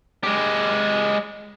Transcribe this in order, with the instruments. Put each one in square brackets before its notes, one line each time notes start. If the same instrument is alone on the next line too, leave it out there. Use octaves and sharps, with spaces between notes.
[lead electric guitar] G#3 G4